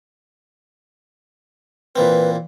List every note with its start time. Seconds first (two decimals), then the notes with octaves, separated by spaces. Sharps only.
1.96 A#2 E3 C4 B4